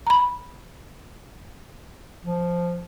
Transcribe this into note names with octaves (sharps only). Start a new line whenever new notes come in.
A#5 B5
F3